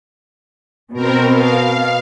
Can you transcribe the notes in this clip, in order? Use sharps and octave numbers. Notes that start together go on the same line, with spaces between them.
B2 C4 A#4
F5